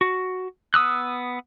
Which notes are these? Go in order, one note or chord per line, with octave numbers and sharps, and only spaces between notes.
F#4
B3 D#6 E6 F#6